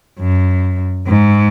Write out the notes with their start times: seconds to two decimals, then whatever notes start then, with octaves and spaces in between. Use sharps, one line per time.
0.19 F#2
1.07 G#2